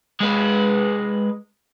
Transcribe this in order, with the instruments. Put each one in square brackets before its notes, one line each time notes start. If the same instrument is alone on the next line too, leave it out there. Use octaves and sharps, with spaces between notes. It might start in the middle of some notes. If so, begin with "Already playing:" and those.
[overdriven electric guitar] G#3 B4